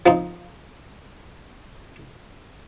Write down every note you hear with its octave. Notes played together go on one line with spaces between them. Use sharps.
F3 C4 D#4